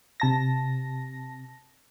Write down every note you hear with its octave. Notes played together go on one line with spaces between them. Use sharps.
C3 A5 A#6